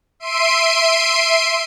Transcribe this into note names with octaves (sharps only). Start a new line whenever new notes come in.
E5 C6 C7 D7 D#7